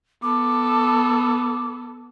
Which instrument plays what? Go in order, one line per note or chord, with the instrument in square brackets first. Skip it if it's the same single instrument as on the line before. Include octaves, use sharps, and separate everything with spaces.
[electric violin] B3 A4 [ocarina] D6